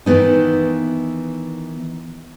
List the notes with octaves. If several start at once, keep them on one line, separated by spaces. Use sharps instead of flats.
D#3 E3 B3 D#4